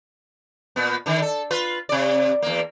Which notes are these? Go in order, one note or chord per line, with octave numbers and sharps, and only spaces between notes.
A#2 B3
D3 D#3
A4
F4 B4
C3 D5
E2 A#3